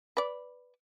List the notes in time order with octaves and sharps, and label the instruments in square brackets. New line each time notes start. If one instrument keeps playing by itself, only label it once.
[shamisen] B4 D5